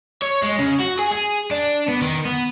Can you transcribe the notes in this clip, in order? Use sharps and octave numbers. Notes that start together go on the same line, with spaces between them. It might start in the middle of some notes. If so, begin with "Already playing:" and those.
C#5
G#3
C#3
F#4
G#4
G#4
D4
B3
D#3
B3